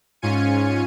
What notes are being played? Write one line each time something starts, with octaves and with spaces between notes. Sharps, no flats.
G#2 C#4 F4 G#5 C#7 D#7